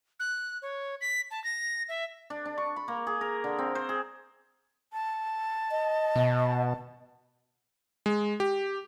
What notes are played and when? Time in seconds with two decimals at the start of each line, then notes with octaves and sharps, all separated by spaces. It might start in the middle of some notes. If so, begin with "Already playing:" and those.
0.20 F#6
0.62 C#5
1.01 B6
1.31 A5
1.44 A#6
1.89 E5
2.30 D4
2.45 D4
2.58 C#6
2.76 B5
2.88 A#3
3.07 G#4
3.21 A#4
3.44 D3
3.58 C4
3.75 C5
3.89 G#4
4.93 A5
5.71 D#5
6.16 B2
8.06 G#3
8.40 G4